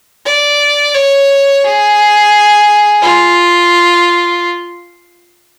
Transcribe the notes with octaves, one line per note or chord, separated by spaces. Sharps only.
D5
C#5
G#4
F4